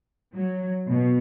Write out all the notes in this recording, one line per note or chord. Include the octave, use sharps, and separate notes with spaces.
F#3
B2